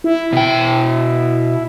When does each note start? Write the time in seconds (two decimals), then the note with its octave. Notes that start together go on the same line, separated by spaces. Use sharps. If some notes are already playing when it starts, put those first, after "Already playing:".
0.04 E4
0.33 B2 G5